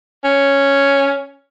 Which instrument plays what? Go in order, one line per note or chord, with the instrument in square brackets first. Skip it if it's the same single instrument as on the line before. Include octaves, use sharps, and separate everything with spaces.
[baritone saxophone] C#4